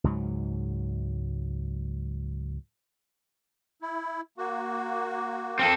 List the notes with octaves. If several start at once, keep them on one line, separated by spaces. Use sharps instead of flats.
C#2 G#2 F#3
E4
A#3 F#4
C4 A4 A#4 F5